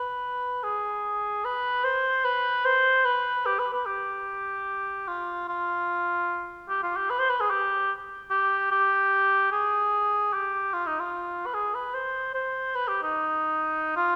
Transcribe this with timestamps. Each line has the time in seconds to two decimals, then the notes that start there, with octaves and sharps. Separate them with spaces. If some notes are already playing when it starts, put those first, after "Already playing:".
Already playing: B4
0.64 G#4
1.45 B4
1.85 C5
2.25 B4
2.66 C5
3.05 B4
3.46 G4
3.60 B4
3.73 B4
3.86 G4
5.08 F4
5.48 F4
6.69 G4
6.83 F4
6.96 G4
7.10 B4
7.19 C5
7.30 B4
7.40 G#4
7.51 G4
8.30 G4
8.72 G4
9.52 G#4
10.34 G4
10.74 F4
10.87 D#4
11.00 F4
11.46 B4
11.54 G#4
11.75 B4
11.94 C5
12.35 C5
12.75 B4
12.88 G4
13.03 D#4
13.96 F4